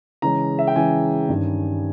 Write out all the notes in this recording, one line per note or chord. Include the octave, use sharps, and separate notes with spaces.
C#3 E3 G#3 C#4 A#5
E5
G5
C#3 E3 G#3 C#4 G#5
G2 D#3 G3 C#4